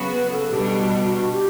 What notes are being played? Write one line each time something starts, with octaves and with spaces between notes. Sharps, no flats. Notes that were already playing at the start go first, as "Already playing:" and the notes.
Already playing: C#3 F#3 B3 F#4
B4
A4
B2 G3 D4 G4
F#4
F#4
G4